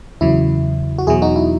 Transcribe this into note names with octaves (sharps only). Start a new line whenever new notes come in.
E2 C#3 F#3 E4
F#4
E2 B2 F#3 E4 G#4
D#4 F#4
E4